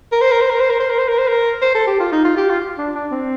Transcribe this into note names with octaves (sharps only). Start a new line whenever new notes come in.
A#4
C5
A#4
C5
A#4
C5
A#4
C5
A#4
C5
A#4
C5
A#4
C5
A4
G4
F4
D#4
F4
G4
F4
D4
D4
C4